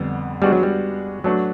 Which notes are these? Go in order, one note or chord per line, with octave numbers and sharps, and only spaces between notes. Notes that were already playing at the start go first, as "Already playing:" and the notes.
Already playing: F2 D3 G3 B3
G3 G#3 B3 D4 F#4
F#3
G3
F#3 A3 D4 F#4 B4